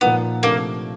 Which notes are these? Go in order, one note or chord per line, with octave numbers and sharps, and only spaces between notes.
A#2 F3 A#3 B3 D#4
C3 F3 A3 A#3 D4